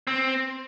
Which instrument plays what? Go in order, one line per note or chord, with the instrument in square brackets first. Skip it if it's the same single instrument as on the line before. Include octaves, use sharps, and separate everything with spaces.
[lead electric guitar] C4